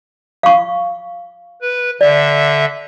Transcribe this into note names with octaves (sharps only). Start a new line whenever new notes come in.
F5 C#6
B4
D3 D5 E5